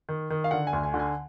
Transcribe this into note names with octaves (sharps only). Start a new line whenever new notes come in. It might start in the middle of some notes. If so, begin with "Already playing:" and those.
D#3
D#3
F5
D3 F#5
G#5
D2
G#5
D3
G#5